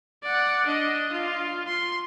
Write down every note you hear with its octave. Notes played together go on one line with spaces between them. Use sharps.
D5 F#5
D4 D#5
F4
C6